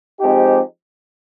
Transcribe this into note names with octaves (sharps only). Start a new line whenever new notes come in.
F3 G#3 C4 D#4 G4